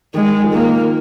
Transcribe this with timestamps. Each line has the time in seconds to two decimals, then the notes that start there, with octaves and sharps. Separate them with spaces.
0.14 D#3 G#3
0.44 F3
0.53 D#3 A#3